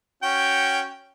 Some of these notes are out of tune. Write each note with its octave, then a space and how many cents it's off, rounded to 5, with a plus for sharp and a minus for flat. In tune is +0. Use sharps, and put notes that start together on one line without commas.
C#4 +0 F#4 +0 G5 +0